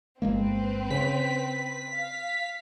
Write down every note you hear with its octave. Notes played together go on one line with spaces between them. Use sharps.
G1 G#3 A#3 C4 B4
C#3 B6
F5